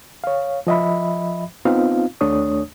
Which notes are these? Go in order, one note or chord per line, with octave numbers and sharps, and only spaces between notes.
C#5 F5
F3 D#5 E5 B5
B3 C4 D#4 F4 F5
D#2 A3 D4 C#5 D#6